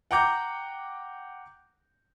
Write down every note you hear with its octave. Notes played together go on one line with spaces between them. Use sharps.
F#5 G5 A#5 D6 G6